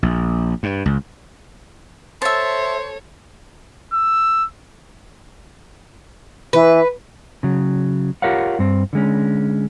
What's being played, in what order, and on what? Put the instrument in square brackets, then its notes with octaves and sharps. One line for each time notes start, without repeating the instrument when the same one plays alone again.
[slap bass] A#1
G2
C#2
[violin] A4 C#5 [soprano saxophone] C5 [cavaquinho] E5 A5
[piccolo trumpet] E6
[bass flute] E3 [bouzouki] B4
[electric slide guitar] C#3 F#3
F4 G4 A#4 C#5 F5 F#5
G2 C4
D3 G#3 C#4